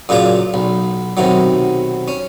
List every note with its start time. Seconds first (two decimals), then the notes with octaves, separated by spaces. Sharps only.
0.09 F#2 A#2 C#3 F4 D5
0.54 B1
1.17 B1 C3 D#3 F#3
2.08 C#4